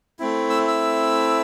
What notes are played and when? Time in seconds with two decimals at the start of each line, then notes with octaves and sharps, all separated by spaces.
0.19 A3 C4 E4
0.50 E6
0.68 E6